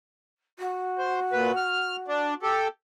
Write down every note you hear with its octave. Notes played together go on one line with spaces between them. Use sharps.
F#4
C5
A#2 B4
F6
D4
G4 A4